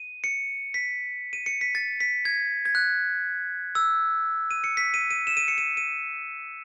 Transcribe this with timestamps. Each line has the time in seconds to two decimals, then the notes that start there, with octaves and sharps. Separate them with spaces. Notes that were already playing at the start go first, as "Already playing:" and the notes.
Already playing: D#7
0.24 C#7
0.74 B6
1.33 D#7
1.46 C#7
1.61 B6
1.75 A6
2.00 B6
2.25 G#6
2.65 G#6
2.75 F#6
3.75 E6
4.51 D#7
4.64 C#7
4.77 B6
4.94 D#7
5.11 D#7
5.27 E7
5.37 D#7
5.48 C#7
5.58 D#7
5.77 D#7